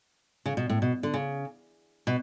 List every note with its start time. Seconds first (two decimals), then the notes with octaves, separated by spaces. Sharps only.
0.46 C#3
0.57 B2
0.69 A2
0.82 B2
1.03 D3
1.14 C#3
2.07 B2